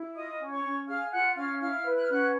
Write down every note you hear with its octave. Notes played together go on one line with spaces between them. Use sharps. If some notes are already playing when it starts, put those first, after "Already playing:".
Already playing: E4
F4 D#5 D#6
C#4
C#5 C#6
C#4
G#4 F5 F6
F4 F#5 F#6
C#4 F5 F6
E4 F5 F6
B4
F#6
F6
C#4 F#5 F#6